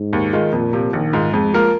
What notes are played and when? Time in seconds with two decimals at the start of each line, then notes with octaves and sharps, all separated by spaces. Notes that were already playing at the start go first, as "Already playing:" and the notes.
Already playing: G#2
0.13 D#2
0.33 D#3 G#3 F4
0.52 F2 A#2
0.73 C3 F3
0.93 A#1 D#3
1.13 G#2 G#3 F4
1.33 F2 G#3
1.53 F3 A#3 F4 A#4